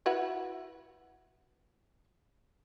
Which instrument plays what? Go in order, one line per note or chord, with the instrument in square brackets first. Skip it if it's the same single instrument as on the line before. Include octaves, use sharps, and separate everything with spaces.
[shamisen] E4 F#4 B4